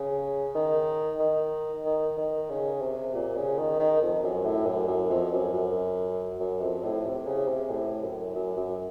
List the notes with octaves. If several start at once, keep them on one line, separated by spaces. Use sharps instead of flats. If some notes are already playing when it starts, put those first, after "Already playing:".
Already playing: C#3
D#3
D#3
D#3
D#3
C#3
C3
A#2
C#3
D#3
D#3
F2
F#2
A2
F#2
F#2
F2
F#2
F#2
F#2
F2
A2
C3
C#3
C3
A2
F#2
F#2
F#2